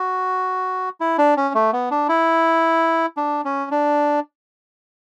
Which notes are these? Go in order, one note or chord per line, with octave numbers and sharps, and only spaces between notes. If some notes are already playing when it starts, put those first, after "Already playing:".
Already playing: F#4
E4
D4
C#4
A3
B3
D4
E4
D4
C#4
D4